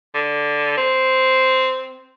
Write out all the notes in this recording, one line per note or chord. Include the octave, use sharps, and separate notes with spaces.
D3
C4